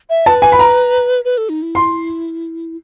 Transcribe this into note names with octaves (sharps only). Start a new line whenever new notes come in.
E5
B4 A5
G#5
B5
A#5
B4
A4
D#4
E4
C6